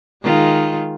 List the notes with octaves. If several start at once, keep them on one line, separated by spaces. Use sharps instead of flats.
D#3 G#3 F4